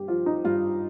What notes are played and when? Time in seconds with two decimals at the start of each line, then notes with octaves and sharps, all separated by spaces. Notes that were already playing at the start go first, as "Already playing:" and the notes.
Already playing: G2 G4
0.08 F3 F4
0.26 D#4
0.44 G2 F4